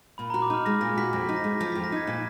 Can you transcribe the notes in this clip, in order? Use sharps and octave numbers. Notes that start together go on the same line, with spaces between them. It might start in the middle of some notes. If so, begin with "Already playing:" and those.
A#2 B5
F#4 A#5
D6
D#4 F6
G#3 A#6
A#2 A#6
F#4 B6
F2 A#6
D#4
A#6
G#3
F3 A#6
F2 B6
A#6
D#4 G#6
A#2